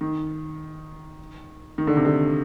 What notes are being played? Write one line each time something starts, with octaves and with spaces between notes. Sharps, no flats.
D#3
D#3
D3
C3
D3